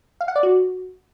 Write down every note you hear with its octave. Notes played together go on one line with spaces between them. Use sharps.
F5
F#5
D5
F#4